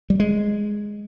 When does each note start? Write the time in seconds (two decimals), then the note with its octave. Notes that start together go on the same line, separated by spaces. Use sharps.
0.10 G3
0.20 G#3